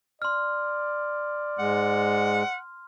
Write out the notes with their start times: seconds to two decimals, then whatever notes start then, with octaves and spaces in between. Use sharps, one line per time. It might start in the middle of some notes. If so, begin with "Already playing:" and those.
0.22 D5 C6 F6
1.59 G#2 G#3 F#5